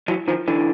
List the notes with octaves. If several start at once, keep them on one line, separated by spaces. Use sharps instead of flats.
E3 F#3
D#3 F3
D3 E3